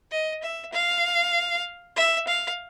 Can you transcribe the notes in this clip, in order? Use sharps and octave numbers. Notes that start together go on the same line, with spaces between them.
D#5
E5
F5
E5
F5